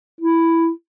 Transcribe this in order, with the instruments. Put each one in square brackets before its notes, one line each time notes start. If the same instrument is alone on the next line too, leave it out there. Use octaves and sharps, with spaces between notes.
[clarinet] E4